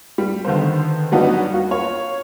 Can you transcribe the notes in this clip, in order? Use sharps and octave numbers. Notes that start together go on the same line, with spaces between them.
G3
D3 D#3 B3 C5
F#3 G3 B3 D4 D#4 F#4
A#3 F#4
F4 C#5